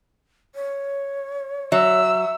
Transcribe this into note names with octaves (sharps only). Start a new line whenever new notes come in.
C#5
F#3 E5 E6